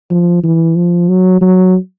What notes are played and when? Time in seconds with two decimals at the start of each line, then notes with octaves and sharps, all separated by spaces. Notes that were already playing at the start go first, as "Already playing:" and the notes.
0.11 F3
0.43 E3
0.76 F3
1.08 F#3
1.41 F#3